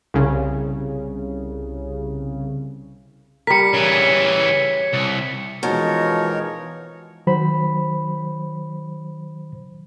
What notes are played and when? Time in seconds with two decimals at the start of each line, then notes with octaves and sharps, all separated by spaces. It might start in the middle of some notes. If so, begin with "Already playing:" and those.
0.14 C2 C#3
3.47 G3 A#4 B6 C#7
3.73 C#3 E3 C#5
4.93 C2
5.63 B2 E3 F3 G#3 D#4 A#4 C#5
7.27 D#3 F#3 C5 B5